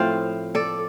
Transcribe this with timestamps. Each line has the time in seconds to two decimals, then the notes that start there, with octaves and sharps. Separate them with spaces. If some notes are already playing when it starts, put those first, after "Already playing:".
Already playing: A2 F3 C4 C5 F5
0.55 A4 D5